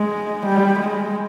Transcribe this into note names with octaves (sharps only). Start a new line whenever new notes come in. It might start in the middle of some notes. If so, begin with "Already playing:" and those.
Already playing: G#3
G3
G#3